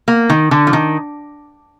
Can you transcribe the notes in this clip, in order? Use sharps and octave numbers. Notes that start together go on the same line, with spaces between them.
A#3
D#3
D3
F3
D#3